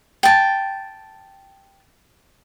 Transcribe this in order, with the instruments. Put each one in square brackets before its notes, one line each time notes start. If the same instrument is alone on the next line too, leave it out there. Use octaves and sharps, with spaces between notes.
[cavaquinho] G5 A5